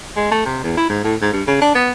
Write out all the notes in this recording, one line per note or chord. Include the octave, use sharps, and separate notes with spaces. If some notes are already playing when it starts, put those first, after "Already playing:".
G#3
A3
C3
E2
E4
G#2
A2
G#2
G2
C#3
D4
B3